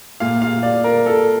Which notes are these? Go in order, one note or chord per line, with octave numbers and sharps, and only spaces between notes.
A#2 F5
F5
D5
A#4
A4